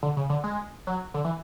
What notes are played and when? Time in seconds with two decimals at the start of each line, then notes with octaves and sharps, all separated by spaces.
0.03 D3
0.17 C#3
0.30 D3
0.44 G#3
0.87 F#3
1.14 D3
1.25 E3